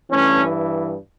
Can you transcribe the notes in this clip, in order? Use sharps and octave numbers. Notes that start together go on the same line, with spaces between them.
G2 E3 A3 C#4